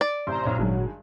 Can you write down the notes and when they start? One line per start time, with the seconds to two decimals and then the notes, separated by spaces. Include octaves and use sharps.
0.01 D5
0.27 A1 C3 C5 A#5 C6
0.45 B1 A#2 C#5
0.57 G#1 G2 D#3 F#3 G#3